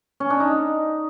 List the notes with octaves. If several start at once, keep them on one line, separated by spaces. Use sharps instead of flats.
C#4
D4
D#4